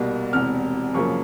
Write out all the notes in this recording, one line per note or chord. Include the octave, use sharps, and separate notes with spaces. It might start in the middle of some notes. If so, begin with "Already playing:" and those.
Already playing: C2 B2 G3 A#3
E1 E2 C3 F6
F#2 C#3 F3 A#3 C#6